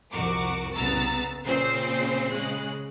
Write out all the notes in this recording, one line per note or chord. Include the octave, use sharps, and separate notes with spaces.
C2 F2 F#4 A#4 D6
C2 C#3 B3 A#5 E6 A6
A#2 C#3 C4 C5 C7
C#3 G#3 F#6